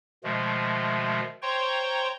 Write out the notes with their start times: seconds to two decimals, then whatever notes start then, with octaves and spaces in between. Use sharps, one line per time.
0.24 B2 D#3 F3 G#3 A3
1.42 C5 C#5 G5 A#5 C6 C#6